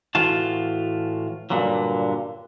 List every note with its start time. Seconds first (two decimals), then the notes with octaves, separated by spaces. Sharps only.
0.15 A2 E3 F4 F#4 A5
1.50 G2 A#2 D3 F#3